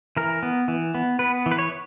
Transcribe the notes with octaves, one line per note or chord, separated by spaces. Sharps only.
E3 A#4
B3
E3
B3
B3 B4
E3
B4
C#5